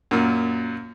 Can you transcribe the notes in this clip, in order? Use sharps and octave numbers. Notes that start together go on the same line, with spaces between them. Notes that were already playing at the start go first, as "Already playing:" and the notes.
F#2 A#2